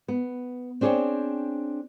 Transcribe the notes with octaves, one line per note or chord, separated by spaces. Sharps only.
B3
C4 D4 G#4 C5 C#5 G5